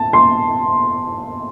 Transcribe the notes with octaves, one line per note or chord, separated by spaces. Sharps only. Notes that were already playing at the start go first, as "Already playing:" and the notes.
Already playing: A5
C6